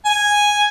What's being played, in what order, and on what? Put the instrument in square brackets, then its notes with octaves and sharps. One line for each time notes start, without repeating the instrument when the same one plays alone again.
[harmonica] G#5